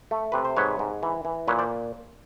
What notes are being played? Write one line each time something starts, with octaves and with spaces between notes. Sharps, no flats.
A3
C3 B4
C5
G#2 B4 C#5
G#2
E3
E3
A#2 B4 C#5
C5 D5